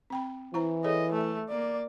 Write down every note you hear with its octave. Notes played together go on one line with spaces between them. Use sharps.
C4 G5 B5
E3 E4 C5 A#5
G#4 A4 C#5 D#5
A3
A#3 D5